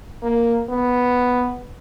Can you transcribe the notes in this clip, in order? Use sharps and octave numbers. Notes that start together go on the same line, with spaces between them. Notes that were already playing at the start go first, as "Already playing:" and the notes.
A#3
B3